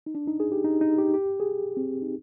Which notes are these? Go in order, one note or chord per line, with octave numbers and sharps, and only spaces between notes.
D#4
D4
D#4
G#4
G4
D#4
D#4
G4
G4
G#4
C4
D#4